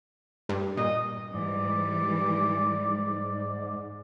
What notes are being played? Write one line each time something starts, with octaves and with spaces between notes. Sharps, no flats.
G2
A#2 D#5
G#2 E3 G3 D5